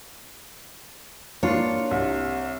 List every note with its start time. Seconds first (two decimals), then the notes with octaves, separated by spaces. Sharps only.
1.43 A#3 D4 F4 C#5
1.91 C2